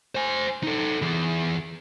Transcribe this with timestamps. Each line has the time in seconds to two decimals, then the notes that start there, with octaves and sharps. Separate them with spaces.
0.15 C5 G#5
0.63 D#4 A4
1.02 E3 G#4